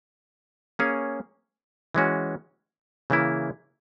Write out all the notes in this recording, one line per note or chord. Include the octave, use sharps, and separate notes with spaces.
A#3 C#4 G#4 C#5
E3 G#3 C#4 F#4
C#3 E3 A#3 E4